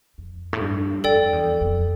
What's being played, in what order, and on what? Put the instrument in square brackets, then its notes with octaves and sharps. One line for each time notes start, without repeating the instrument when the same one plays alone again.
[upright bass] F2
A2
G2
[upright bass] F2 [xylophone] A4 D5 G5
[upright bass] E2
F2